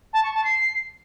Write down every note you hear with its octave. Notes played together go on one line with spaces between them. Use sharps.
A5
C#6
A5
C7